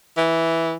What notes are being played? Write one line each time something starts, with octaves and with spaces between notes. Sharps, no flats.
E3